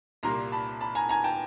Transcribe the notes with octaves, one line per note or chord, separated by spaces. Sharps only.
C2 A#2 G3 A#3 A#5 C6
A5 B5
A5 B5
G#5 A#5
G#5 A#5
G5 A5